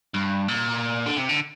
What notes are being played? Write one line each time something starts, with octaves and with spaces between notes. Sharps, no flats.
G2
A#2
D3
C3
D3